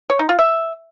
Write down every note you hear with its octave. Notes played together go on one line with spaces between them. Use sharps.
C#5
D#4
F4
E5